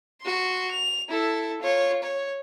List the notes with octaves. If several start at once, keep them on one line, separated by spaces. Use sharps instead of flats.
F#4 C6
F7
E4 A4
F4 C#5
C#5